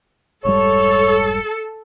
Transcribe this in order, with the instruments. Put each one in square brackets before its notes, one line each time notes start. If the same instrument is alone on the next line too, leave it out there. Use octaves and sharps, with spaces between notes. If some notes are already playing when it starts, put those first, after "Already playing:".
[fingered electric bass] F1 G#2 G3 [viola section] A4 [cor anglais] C#5